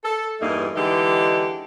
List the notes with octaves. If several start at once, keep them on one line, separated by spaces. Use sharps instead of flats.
A4
E2 G2 A3 A#3 D#4
D3 E3 G#3 D#4 G4